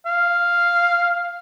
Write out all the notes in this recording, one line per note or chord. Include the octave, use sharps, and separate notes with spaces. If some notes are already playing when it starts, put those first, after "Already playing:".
F5